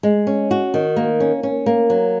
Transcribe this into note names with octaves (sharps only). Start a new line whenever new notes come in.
G#3
C#4
F#4
D#3
A#3
C#4
C#4
A#3
F#3